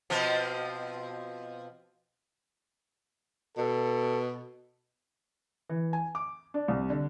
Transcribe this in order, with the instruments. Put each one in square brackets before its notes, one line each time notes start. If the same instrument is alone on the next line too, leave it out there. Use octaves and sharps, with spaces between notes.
[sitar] B2 F3 C4
[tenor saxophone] B2 [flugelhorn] A4
[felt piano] E3
G#5
D6
D4
C2
D3